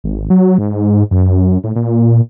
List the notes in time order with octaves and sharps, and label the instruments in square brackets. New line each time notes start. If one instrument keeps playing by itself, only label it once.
[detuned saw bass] G#1
F#3
G#2
F#2
A2
A#2